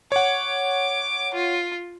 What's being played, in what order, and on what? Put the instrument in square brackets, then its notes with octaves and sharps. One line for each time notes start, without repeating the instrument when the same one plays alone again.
[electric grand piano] C#5 F#5 [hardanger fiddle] D6
[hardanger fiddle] F4